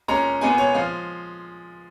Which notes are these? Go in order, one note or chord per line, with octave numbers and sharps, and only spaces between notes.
A#2 G#3 C#4 A#5
A#2 G#3 B3 G#5
C#5
F3 G#3 F5